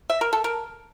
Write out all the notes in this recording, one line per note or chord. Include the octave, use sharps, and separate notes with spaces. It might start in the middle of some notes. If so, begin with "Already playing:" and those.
E5
A#4
A4
A#4